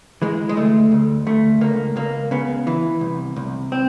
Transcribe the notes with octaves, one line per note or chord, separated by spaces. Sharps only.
E3 G#3
G#3
D2 A3
D2
D2 A3
C#2 A#3
C#2 A#3
C#3 B3
E3
C2
C2
C4